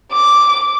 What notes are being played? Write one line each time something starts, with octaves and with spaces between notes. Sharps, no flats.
D6